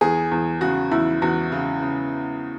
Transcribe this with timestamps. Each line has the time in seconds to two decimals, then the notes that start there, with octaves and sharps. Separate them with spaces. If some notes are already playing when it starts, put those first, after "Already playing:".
0.01 E2 G#4
0.31 E2
0.61 C#3 F#4
0.91 E2 E4
1.22 E2 F#4
1.52 C#3
1.82 C#3